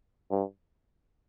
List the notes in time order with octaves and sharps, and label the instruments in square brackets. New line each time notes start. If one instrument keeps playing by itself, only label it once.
[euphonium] G2